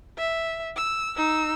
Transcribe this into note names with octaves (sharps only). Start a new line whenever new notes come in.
E5
E6
D#4 E6